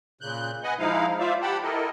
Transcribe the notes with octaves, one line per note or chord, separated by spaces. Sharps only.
A#2 C#3 F#6 G6
B4 D#5 F#5 G#5
F3 G#3 D#4 E4 F5
F4 C5 D5 E5 F5
G4 F#5 G5 A5 B5
E4 A4 A#4 D#5